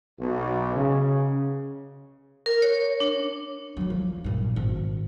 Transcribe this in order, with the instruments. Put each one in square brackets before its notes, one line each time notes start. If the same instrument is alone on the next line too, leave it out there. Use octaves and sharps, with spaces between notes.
[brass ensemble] B1
C#3
[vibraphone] A#4
C#5
D4
[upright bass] D3 F#3
F3
G2 A#2
G#1